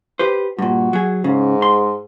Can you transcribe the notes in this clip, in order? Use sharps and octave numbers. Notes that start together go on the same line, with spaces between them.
G4 B4 C5
G2 A#2 F#4
F#3 G#4
G#2 C#3
C6